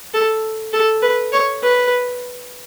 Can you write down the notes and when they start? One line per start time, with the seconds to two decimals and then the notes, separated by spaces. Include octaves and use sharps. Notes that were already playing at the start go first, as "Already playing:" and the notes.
0.14 A4
0.73 A4
1.02 B4
1.33 C#5
1.63 B4